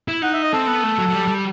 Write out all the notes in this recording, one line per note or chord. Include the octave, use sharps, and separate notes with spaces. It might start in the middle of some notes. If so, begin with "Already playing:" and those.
E4
D#4 F#5
E5
D#5
C4 A4
B3
A3
F#3
F#3
G3
G3